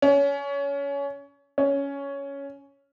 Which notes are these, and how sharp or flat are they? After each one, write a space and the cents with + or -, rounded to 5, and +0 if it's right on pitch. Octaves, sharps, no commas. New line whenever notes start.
C#4 +25
C#4 +10